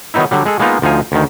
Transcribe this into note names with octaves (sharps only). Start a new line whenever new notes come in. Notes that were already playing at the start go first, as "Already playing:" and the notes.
D#3 F#3 B3 D#4 E4
D3 F#3 G3
G#3 G#4 A4
G#3 A#3 B3 D#4 F4
D2 F3 D#4 F5 G#5
D2 D#3